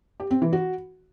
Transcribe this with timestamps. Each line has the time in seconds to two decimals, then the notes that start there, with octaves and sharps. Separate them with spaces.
0.20 G4
0.31 C4
0.42 E3
0.53 F#4